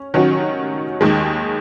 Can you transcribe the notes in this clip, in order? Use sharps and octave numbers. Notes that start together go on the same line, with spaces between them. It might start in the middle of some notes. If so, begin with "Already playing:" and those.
Already playing: C#4
D#3 F#3 C#4 F#4
D#2 D#3 G#3